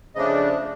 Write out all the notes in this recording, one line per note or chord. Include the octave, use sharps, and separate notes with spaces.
C#3 F3 A3 D4 D#5